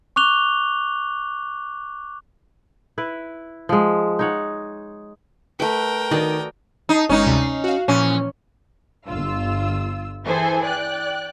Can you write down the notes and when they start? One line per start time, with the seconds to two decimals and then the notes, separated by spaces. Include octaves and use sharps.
0.16 C#6 D6 F#6 F7 G7
2.98 E4 B4
3.69 F3 G#3
4.19 D#4 C#5 F#5
5.60 A3 A#4 B4 G5
6.11 D#3 F#4 D5 D#5
6.89 D#4 A5 D#6 C7
7.09 G1 G#3 C#4 D#4
7.26 D2 C3 G3
7.42 C7
7.64 F#4 F5
7.88 A#2 E3 F3 C#4
9.07 G1 F4 E6
10.25 E3 E4 G#4 A4 C5 G#5
10.64 D5 G5 F#6